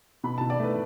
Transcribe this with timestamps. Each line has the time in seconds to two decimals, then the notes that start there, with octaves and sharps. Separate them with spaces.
0.23 B2 B5
0.38 B2 A5
0.50 D5
0.59 A3 B4